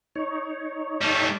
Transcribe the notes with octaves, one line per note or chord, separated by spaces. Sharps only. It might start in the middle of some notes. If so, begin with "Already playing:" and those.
D#4 C#5
G3 A3